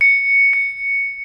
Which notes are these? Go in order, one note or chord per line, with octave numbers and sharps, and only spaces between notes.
C#7
C#7